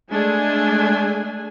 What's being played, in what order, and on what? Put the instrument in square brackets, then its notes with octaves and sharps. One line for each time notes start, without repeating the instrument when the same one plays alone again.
[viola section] G#3 A3 D4 G#5